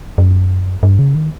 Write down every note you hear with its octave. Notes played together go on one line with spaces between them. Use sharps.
F#2
G2
C#3
D#3